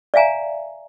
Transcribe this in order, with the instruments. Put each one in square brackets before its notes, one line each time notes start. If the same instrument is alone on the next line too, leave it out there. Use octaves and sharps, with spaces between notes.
[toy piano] D5 E5 F5 G#5 A#5